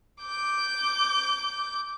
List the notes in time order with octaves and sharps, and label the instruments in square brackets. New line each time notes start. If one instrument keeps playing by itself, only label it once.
[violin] D6 G6